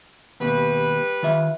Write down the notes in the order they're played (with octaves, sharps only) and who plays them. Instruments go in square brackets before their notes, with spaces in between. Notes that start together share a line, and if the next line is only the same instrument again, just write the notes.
[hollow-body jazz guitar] D#2 B2 [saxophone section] G3 B4
[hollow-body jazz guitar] D#3 F4 E5